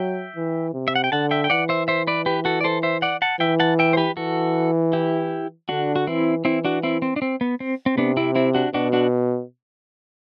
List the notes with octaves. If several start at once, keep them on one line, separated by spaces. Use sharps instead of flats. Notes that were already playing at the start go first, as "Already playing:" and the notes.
Already playing: F#3 E5 G5
E3
C3
E5
F#5
G5
D3 F#5 A5
E5 G5
G5
E3 D5 F#5
C5 E5
C5 E5
B4 D5
G4 B4
F#4 A4
D5
A4 C5
C5 E5
D5 F#5
F#5 A5
E3 E5 G5
F#5 A5
E5 G5
C5
G4 B4
E3 F#4 A4
E4 G4
D3 D4 F#4
F#4
E3 C4 E4
E3 C4 E4
D4 F#4
C4 E4
C4
D4
C4
B3
C4
C4
C3 B3 D4
C4 E4
C4 E4
D4 F#4
B2 D4 F#4
D4 F#4